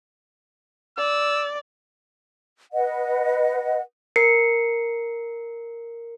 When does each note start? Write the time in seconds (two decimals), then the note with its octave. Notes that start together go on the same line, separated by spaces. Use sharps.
0.98 D5 E6
2.73 B4 D#5 F#5
4.16 A#4 C7 C#7